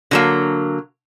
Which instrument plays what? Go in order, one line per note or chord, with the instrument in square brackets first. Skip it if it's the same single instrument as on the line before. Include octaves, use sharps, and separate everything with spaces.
[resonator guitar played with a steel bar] D3 F#3 A#3